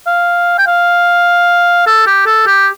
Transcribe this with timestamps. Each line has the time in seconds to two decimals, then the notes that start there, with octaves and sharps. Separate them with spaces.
0.06 F5
0.58 G5
0.67 F5
1.86 A4
2.07 G4
2.26 A4
2.47 G4